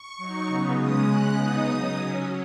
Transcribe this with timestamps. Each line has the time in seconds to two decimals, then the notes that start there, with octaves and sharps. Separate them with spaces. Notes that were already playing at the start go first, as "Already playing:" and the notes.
Already playing: C#6
0.17 F#3 D#4
0.47 C#3 F#3 B3 D#4
0.77 C#3 G#3 C#4 D#6
1.06 C#3 G#3 C#4 F#6
1.36 C#3 B3 D#4 D#6
1.65 C#3 F#3 D#4
1.95 F#3 C#4